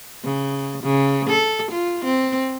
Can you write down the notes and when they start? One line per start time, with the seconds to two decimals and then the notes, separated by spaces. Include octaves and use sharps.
0.24 C#3
0.83 C#3
1.30 A4
1.71 F4
2.05 C4